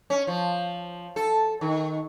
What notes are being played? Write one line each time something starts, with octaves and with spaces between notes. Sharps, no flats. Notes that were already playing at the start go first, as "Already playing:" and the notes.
C#4
F3
A4
D#3